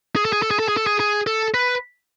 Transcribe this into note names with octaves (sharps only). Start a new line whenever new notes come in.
G#4
A4
G#4
A4
G#4
A4
G#4
A4
G#4
G#4
A4
B4